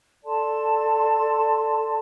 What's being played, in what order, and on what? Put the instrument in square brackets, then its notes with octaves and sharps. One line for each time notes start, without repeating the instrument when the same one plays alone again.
[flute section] A4 D5 A5 C6